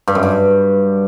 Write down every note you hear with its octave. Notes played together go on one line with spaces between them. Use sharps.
G2
F#2
G2